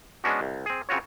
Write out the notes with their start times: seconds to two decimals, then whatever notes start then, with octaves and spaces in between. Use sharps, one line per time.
0.24 G#3 B3 C#4 D4 F#4
0.41 C2
0.66 C4 G#4
0.89 C#3 C4 F4 F#4 C#5